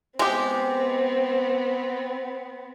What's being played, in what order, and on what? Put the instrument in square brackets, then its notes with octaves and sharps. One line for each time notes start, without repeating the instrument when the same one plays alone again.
[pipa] G#3 G4 [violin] B3 C4